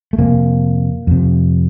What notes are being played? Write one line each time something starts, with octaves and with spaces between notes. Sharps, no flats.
A3
F2 C3 A#3
F2 C3